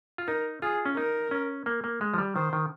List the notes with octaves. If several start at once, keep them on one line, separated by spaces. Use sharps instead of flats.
F4
D#4 A#4
F4 G#4
C#4
D#4 A#4
C#4
A#3
A#3
G#3
F3
G3
D#3 C5
D#3